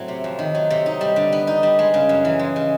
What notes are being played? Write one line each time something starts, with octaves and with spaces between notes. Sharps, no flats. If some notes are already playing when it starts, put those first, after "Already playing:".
Already playing: A2 F#3 A3 C4
C3
F2
D#3
F#3
C3
D#4
G3
D3
B3
D#4
G3
G#3
C#3
F#2
E3
G#3
C#3